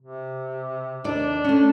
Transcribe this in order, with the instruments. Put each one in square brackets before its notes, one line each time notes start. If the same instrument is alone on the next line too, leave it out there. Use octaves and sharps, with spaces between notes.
[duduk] C3
[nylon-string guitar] D#2 D5 [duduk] D4
[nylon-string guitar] A3 C#4